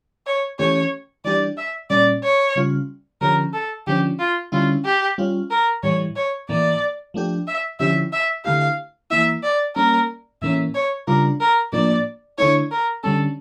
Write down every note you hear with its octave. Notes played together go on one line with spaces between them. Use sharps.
C#5
E3 A3 C#4 G4 C#5
E3 G3 D4 G4 D5
E5
A#2 G3 C#4 D5
C#5
C#3 G3 C#4 F4
D3 F3 C#4 G4 A#4
A4
D3 F3 C#4 G4
F4
D3 G3 C#4 E4 F4
G4
G3 C#4 F4
A#4
A2 E3 G3 C#5
C#5
A2 E3 A#3 D5
F3 A3 D4 G4
E5
D3 F3 C#4 E4 G4 E5
E5
D3 A3 E4 G4 F5
E3 A#3 E4 E5
D5
G3 A#3 C#4 A#4
A2 E3 A#3 C#4 E5
C#5
C#3 G3 D4 F4 A#4
A#4
A2 F3 A#3 D4 D5
D3 A3 E4 C#5
A#4
D3 G3 C#4 A4